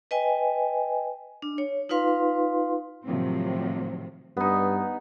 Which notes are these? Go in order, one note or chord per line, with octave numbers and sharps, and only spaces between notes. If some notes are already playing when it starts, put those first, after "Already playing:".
B4 D#5 G5 G#5
D4
C#5
D#4 F4 B4 F5 C6
A2 C3 D#3 F3 F#3 C4
G2 B3 D#4